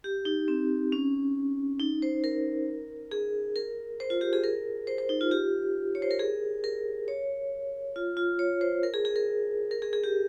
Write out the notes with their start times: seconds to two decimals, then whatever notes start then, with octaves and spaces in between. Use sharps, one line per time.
0.04 G4
0.25 D#4
0.48 C4
0.92 C#4
1.79 D#4
2.02 C5
2.24 A#4
3.11 G#4
3.56 A#4
4.00 C5
4.10 F4
4.21 G4
4.33 G#4
4.43 A#4
4.87 C5
4.98 C5
5.09 D#4
5.21 F4
5.31 G4
5.95 C#5
6.02 C5
6.11 A#4
6.19 G#4
6.64 A#4
7.08 C#5
7.96 F4
8.17 F4
8.39 C#5
8.61 C5
8.83 A#4
8.94 G#4
9.05 G#4
9.16 A#4
9.71 A#4
9.82 G#4
9.93 G#4
10.04 G4